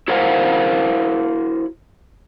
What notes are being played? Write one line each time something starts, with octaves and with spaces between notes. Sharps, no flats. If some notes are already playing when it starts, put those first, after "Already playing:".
E4 F#4 A#4 C5 F5 F#5